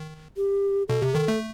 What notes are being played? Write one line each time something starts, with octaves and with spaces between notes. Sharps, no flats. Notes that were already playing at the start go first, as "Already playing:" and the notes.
Already playing: D#3
G4
B2 A4
C3 G4
D#3 A4
A3